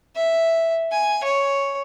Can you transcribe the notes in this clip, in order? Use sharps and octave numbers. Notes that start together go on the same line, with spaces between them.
E5
G#5
C#5